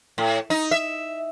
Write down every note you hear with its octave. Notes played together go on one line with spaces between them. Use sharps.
A2
D#4
E5